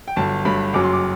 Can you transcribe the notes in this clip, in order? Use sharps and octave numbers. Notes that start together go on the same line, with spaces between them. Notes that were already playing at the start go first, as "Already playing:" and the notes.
G5
G1 G2 F#3 A5
G1 G2 F#3 B5
F#1 F#2 F#3 D6
C6
D6